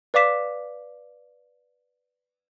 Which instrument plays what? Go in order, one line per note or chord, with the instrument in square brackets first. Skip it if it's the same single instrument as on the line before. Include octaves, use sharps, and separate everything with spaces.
[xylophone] B4 D5 F5 D6 B6 E7